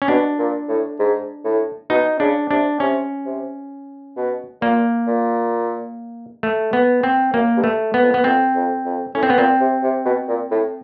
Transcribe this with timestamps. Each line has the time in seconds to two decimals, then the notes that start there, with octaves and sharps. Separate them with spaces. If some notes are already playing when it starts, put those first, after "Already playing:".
0.02 C#4
0.08 B2 D4
0.38 A#2
0.68 A2
0.99 G#2
1.44 A2
1.90 B2 D#4
2.20 C#3 D4
2.51 C3 D4
2.80 C3 C#4
3.26 C3
4.17 B2
4.62 A#2 A#3
5.07 A#2
6.43 A3
6.73 B3
7.03 C4
7.34 F#2 A#3
7.57 G2
7.64 A3
7.94 B3
8.02 F2
8.14 B3
8.24 F2 C4
8.55 F2
8.85 F2
9.15 A2 C#4
9.23 C4
9.30 B3
9.38 A#2 C4
9.60 C3
9.83 C3
10.05 B2
10.28 A#2
10.51 A2